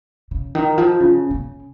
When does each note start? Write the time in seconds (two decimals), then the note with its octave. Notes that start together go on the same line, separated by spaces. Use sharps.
0.31 C#3
0.55 D#3
0.78 F3
1.00 C#3
1.31 C#3